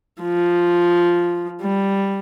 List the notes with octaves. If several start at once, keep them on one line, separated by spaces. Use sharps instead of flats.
F3
G3